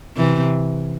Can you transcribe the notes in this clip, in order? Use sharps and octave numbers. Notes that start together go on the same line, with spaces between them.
C3 E3